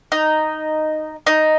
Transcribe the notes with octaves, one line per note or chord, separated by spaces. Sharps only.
D#4
D#4